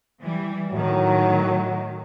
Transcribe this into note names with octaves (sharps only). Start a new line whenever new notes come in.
E3 G3
A2 D#3 F#3